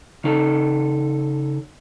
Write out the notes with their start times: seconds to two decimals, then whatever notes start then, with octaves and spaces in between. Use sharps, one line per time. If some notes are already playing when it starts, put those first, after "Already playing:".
0.24 C#3 D#4 A4